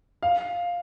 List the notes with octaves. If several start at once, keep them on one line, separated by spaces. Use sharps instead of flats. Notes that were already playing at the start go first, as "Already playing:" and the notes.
F5